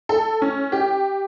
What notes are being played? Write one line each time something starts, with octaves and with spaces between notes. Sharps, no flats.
A4
C#4
G4